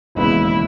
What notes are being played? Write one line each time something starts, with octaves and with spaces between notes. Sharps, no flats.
E1 D#2 C#3 G#3 B3 E4